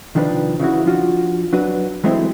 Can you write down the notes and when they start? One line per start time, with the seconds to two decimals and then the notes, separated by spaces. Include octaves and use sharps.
0.15 C2 D#3 F3 D4 G#4 B4
0.60 C#3 E3 E4 F#4
0.86 F3 D4 F4 F#4
1.53 F#3 D4 F#4 B4
2.04 E3 F#3 G#3 A3 C4 E4